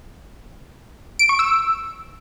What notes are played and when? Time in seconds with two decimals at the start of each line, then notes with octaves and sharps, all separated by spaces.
1.19 D7
1.29 C#6
1.39 E6